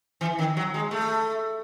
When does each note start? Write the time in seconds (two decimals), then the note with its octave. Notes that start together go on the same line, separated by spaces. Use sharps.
0.21 E3
0.39 D#3
0.57 F#3
0.74 G#3
0.91 A3